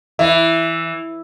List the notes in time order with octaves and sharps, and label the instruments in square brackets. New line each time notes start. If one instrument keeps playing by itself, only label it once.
[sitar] E3 [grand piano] E5